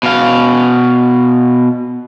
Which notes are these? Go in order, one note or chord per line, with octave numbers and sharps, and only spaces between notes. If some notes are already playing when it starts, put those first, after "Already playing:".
B2 F5